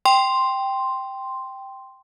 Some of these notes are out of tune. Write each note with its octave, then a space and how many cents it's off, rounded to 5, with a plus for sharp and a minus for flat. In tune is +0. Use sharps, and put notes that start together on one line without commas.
G5 +0 C6 +0